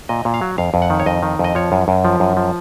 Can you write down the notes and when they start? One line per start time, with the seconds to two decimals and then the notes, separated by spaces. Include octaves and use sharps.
0.09 A#2 D#5
0.25 A#2
0.34 F5
0.41 F#3
0.58 F2 F5
0.74 F2
0.82 F#5
0.90 D#3
1.00 C#5
1.06 F2 D#5
1.23 D#3
1.39 F2 D#5
1.55 F3 C#5
1.72 F#2
1.88 F#2
2.05 F3
2.20 F#2
2.37 F3